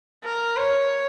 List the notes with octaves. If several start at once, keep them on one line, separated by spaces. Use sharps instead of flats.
A#4
C#5